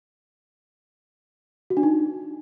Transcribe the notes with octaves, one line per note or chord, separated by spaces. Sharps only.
F#4
D4
D#4